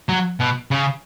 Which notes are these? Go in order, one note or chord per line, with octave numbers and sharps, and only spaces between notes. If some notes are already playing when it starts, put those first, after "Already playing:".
F#3
B2
C#3